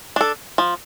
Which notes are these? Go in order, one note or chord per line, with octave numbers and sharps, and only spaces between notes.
D4 A4
F3